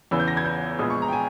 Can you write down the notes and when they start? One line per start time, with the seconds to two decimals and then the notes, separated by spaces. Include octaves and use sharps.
0.11 E2 C#3 E3 E6
0.20 G6
0.28 A#6
0.37 G#6
0.45 G6
0.79 A#1 A#2 G#3 B3 D#6
0.90 C#6
1.02 A#5
1.08 G5
1.13 G#5